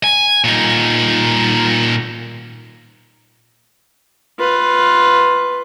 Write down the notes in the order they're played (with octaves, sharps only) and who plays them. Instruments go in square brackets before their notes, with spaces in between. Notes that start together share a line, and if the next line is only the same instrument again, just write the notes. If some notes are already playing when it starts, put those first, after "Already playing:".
[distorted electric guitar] G#5
A#2 D#4
[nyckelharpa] F4 B4